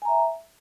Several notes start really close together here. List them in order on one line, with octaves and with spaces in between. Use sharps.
G#5 A#5 E5